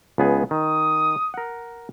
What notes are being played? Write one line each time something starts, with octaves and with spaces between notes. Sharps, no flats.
C#2 B3 G#4
D#3 D#6
A#4 F#5